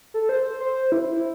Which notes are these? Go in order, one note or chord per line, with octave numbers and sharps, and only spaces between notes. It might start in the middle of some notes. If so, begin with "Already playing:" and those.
A4
C5
C5
E4